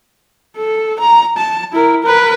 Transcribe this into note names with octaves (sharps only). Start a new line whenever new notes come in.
A4
A#5
A5
E4 A#4
A#4 B4